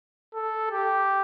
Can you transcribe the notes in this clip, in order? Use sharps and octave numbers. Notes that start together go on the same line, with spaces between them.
A4
G4